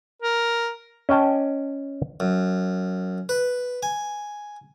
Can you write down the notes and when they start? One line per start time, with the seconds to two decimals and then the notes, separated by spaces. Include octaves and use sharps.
0.22 A#4
1.09 C#4 D#5 G5 A5
2.20 F#2
3.29 B4
3.83 G#5